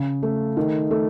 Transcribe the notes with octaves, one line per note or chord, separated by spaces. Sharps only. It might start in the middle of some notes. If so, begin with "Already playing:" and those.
Already playing: C#3
A3
D#3
A3